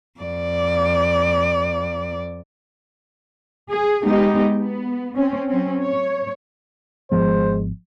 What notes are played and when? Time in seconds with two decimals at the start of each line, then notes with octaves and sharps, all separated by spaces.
0.20 F2 D5
3.69 G#4
4.03 G#3 B3 D#4 G4
4.60 B3
5.16 C4 C#4
5.49 F#3 C4 C#4
5.81 C#5
7.12 G#1 F3 G#3 B3 C5